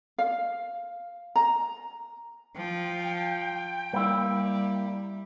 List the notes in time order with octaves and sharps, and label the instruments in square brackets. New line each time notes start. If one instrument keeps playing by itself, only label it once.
[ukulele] F5
A#5
[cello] F3 [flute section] G5
[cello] G3 [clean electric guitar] A#3 E4